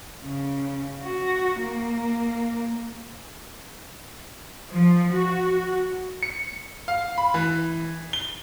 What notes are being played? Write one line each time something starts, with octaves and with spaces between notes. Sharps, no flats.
C#3
F#4
A#3
F3
F#4
C#7
F5
B5
E3
G7